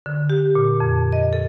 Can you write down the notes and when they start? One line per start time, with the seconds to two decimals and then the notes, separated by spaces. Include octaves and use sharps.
0.06 D3
0.30 G4
0.55 A#2
0.80 F2
1.12 D#5
1.33 A4